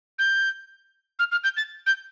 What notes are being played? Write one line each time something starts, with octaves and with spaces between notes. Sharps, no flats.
G6
F6
F6
G6
A6
G6